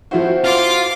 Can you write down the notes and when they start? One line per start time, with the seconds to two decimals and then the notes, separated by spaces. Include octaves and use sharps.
0.11 F3 C4 E4 F#4 C5
0.44 F4 C6 D6